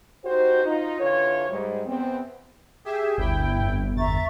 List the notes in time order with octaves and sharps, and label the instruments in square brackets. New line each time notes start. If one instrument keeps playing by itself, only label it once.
[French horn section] D#4 F#4 G4 C5
D#4 F4
D3 E3 F4 C#5
G#2 G3
E2 B3 C4
[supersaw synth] G4 G#4 E5
[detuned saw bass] G1 [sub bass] D2 [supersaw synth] E4 G5
[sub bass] F2
[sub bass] E2 [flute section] E5 A#5 C#6 [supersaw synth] A6